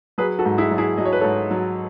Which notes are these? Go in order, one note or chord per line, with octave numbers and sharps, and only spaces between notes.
F#3 G#4 B4
F#4 A4
G#2
E4 G#4
F#3
E4 G#4
F#3 D#5
C#5
B4
G#2 A4 C#5
F#3